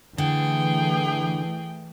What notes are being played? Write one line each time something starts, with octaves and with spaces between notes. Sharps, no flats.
D3 E3 A3 G#4 G5